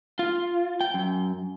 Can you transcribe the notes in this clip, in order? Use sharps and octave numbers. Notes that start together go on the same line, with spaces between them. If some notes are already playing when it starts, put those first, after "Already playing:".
F4
G5
F#2